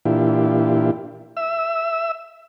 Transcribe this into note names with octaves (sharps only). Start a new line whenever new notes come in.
A#2 E3 D4 E4 F4 G4
E5 E6